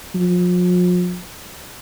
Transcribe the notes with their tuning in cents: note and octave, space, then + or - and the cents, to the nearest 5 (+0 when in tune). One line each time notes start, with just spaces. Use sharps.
F3 +40